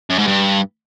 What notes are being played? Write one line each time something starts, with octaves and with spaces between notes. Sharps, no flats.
F#2
G#2
G2